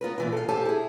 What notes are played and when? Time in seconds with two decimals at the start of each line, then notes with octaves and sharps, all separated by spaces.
0.01 B3 F4 A#4 B4
0.18 A#2 E3 F4
0.32 A4 F5
0.49 G4 A4 C5 F5 G#5 A5
0.65 E4 G#4